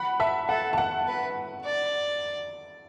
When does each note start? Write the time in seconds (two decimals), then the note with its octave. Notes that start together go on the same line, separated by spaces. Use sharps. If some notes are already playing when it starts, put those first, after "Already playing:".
Already playing: F#5 B5
0.20 E5 A5
0.49 A4 F#5
0.73 A5
0.78 F#5
1.07 B4
1.65 D5